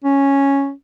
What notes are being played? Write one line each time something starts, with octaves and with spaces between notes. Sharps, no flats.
C#4